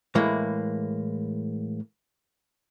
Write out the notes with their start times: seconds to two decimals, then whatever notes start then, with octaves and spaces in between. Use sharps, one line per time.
0.15 A2 E3 G#3 A#3